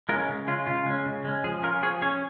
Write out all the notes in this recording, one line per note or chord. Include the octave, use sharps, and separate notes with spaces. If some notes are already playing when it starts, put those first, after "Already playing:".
G#3 C#4 F4 A#4
C#3
G#3 C#4 F4
C#3 F4
G#3 C#4
C#3
G#3 C#4
F3 G#4
C#4 F4 A#4
F3 G#4 C#5
C#4 G#4 C#5